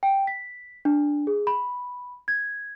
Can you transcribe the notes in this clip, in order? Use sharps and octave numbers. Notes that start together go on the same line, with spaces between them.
G5
B6
D4
G#4
B5
G#6